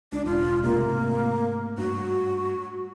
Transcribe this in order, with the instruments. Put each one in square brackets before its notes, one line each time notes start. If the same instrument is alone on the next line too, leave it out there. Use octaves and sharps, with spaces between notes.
[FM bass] C#2 [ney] D4
[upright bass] E1 [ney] F4
[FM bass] C3 [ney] A#3
[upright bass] G#2 A3
[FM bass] G2 [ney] F#4